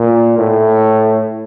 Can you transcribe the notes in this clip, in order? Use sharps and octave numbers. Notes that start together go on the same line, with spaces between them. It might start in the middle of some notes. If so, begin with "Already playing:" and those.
Already playing: A#2
A2